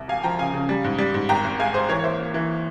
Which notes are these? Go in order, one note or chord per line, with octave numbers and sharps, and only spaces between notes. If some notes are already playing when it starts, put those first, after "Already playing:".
Already playing: C2
E1 F5 G#5
F3 G5 A#5
C#3 F5 G#5
C#3
G3
G#2
G3
G#2
G#1 G5 A#5
G#1
G#3 F5 G#5
G#1 G#4 C5
E3 A#4 C#5
C#5
A#3 C5 E5
A#3
E3